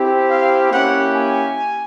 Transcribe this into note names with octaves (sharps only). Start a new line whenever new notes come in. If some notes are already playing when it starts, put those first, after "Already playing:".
Already playing: C4 E4 G4
F5
A#3 C#4 E4 G4 F#5
G#5